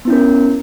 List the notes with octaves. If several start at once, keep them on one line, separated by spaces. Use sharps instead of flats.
B3 C#4 E4 A#4